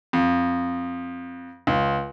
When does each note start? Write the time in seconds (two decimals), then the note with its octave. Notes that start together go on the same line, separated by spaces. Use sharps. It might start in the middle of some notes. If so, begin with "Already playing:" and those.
0.13 F2
1.67 C#2